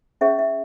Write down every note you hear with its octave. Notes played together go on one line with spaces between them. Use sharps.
C#4 G#4 C#5 E5
E5